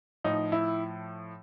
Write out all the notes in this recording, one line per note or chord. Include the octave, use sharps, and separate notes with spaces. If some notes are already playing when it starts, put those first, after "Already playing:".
A2 F3 D#4
E4